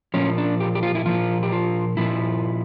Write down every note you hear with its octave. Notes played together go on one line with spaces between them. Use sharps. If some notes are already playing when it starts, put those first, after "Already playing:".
A#2 F3 C#4
D4
G4
G4
F4
E4
A#2 F3 F4
G4
F4
A#2 F3 E4